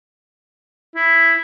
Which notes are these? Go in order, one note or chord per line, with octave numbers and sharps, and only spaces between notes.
E4